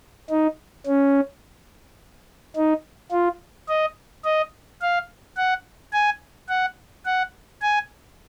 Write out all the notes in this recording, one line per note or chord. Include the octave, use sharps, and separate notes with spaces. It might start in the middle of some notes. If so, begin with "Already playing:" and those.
D#4
C#4
D#4
F4
D#5
D#5
F5
F#5
G#5
F#5
F#5
G#5